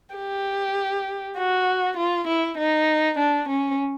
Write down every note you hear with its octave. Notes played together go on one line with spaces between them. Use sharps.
G4
F#4
F4
E4
D#4
D4
C#4